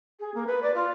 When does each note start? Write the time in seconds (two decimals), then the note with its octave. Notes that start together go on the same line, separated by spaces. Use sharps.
0.19 G#4
0.34 A#3
0.47 B4
0.62 D5
0.74 F4